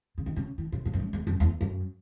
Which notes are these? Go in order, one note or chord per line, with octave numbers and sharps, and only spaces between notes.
C#3
D#3
C#3
E3
A#2
A#2
F#2
G#2
E2
F#2
E2
F#2